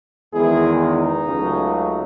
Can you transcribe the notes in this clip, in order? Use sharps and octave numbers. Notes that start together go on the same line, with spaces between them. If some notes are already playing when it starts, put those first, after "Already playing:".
E2 D#3 G#3 E4 G#4
D#4
C#2 C#3 F#3 A3